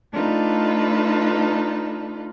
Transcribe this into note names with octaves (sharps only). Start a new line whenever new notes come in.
A3 D4 D#4 F4 A4 B4